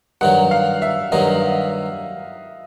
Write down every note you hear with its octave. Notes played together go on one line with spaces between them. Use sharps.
G2 D#3 F#3 F#5
F5
E5
G2 D#3 F#3 D#5